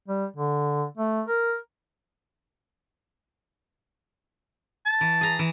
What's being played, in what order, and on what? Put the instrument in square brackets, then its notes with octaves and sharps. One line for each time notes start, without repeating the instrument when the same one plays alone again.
[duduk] G3
D3
A3
A#4
[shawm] A5
[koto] E3
G#4 A#5
E3